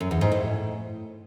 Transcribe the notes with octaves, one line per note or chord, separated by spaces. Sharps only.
F#2
E2
G#2
A2